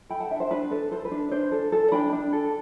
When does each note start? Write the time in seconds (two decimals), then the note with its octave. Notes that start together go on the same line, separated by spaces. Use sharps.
0.10 A4 G5 B5
0.20 F#5 A5
0.31 D4 E5 G5
0.40 C5
0.51 D4 B4
0.71 A4 B4
0.91 A4 C5
1.05 B4
1.11 D4
1.31 D4 C5
1.52 A4
1.72 A4
1.92 D4 G5 B5
2.13 D4
2.33 A4